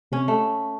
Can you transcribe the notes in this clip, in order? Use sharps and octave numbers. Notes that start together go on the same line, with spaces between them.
C3 C#4
A3